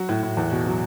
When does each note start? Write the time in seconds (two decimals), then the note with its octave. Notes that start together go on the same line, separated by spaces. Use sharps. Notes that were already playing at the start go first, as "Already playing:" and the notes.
Already playing: F#3 F#4
0.09 A2
0.23 A2
0.37 E2
0.52 B2
0.66 F#3